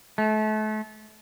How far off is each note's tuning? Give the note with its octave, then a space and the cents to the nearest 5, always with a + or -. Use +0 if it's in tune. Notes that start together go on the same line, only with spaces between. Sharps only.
A3 -35